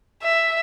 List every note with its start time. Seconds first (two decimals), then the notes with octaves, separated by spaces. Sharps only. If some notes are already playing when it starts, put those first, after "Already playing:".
0.22 E5